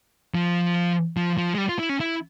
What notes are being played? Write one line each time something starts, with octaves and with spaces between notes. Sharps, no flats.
F3
F3
F3
G#3
G3
F4
E4
C#4
E4